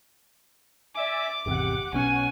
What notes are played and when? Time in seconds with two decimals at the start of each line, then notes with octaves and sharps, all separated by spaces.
0.95 D5 E5 G#5 D6
1.46 G#1 E2 C3 G4 F#5
1.93 B1 B2 C#4 C#5 F#5 G#5